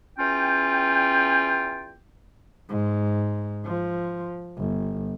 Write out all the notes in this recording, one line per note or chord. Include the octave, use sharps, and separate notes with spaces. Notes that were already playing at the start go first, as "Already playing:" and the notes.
E2 C#4 F4 G5
G#2
F3
G1